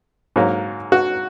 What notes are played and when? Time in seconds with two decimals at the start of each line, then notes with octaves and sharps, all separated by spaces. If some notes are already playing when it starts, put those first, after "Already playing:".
0.36 G#2 F#3 A#3
0.92 F#4